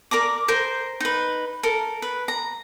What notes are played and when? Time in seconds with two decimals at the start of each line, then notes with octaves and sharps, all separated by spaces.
0.11 A#4 D5 A#5 D6
0.48 A#4 C5 C6
1.00 D#4 B4
1.63 A4 A#4
2.02 B4
2.28 A#5